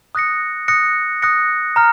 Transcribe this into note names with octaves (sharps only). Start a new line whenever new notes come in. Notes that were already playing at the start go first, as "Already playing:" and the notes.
D#6 F#6 A#6 C#7
D#6 F#6 A#6 C#7
D#6 F#6 A#6 C#7
A#5 F6